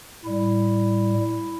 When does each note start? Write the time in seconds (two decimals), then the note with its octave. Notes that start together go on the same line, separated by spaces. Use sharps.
0.25 A2 G3 E4